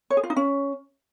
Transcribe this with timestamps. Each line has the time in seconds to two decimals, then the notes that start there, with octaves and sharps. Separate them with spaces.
0.10 C#5
0.17 G#4
0.23 F4
0.30 D#4
0.36 C#4